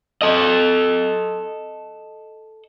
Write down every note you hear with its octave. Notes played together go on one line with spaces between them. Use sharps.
A4 D#5